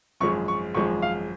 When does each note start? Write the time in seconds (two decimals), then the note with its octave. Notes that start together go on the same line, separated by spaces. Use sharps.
0.21 G#1 F#2 F3 G#3 C#6
0.48 C#6
0.75 G#1 F#2 F3 G#3 C#6
1.02 F5